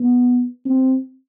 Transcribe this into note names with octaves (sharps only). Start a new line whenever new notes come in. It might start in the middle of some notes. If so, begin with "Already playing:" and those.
Already playing: B3
C4